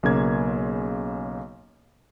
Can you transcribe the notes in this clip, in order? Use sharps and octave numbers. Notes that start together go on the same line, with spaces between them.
B1 C#3 A#3 G#6